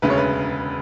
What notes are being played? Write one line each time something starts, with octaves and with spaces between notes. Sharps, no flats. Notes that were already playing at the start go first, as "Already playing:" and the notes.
E1 D2 C#3 B4
C#5
B4